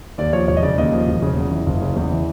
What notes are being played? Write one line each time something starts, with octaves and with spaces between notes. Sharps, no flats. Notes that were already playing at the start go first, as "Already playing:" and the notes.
D#2 D5
F3 C#5
E1 C#5
D#5
C#3 D5
D#2 D#5
F3
E1
C#3
E2
E3
F#1
C#3
E2
E3